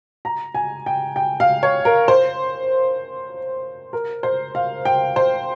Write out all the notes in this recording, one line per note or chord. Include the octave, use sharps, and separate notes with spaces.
A#5
G#5
G5
G5
F5
C#5
A#4
C5
A#4
C5
F5
G5
C5